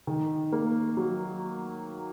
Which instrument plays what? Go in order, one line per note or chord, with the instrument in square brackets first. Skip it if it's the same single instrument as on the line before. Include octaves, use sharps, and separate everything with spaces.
[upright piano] D#3
A#3
F#3